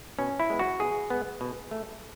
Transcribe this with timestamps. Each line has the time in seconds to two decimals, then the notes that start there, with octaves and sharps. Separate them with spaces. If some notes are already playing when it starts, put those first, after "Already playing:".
0.19 B2 C#4
0.40 E4
0.50 G#3 B3
0.59 F#4
0.80 B2 G#4
1.10 G#3 B3
1.41 B2
1.71 A3